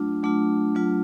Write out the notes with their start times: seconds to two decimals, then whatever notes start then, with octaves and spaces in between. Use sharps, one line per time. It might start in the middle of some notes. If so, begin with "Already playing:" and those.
Already playing: F#3 A3 D4 F4
0.23 F#3 A3 D4 F4
0.75 F#3 A3 D4 F4